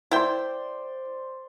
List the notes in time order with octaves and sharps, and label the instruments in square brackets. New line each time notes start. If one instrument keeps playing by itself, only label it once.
[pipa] E4 G5 [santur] C5 D5 C6